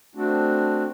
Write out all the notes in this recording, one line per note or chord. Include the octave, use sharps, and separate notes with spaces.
A3 C4 D4 F#4